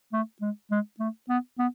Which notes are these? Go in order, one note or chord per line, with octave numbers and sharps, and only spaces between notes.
A3
G#3
G#3
A3
B3
B3